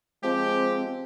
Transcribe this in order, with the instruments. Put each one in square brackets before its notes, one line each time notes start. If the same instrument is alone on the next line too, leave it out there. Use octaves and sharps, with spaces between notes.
[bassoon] F3 [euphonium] G#3 [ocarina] C4 [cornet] G4